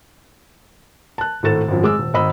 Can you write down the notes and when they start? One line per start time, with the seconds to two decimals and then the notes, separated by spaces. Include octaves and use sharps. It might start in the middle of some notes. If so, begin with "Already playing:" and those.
1.18 A5 F#6
1.43 G#1 A2 A3 A4 A6 E7
1.68 G#1 F#2 F3
1.83 G#3 D6 E6
1.99 D#1
2.14 G#1 D#5 B5 E6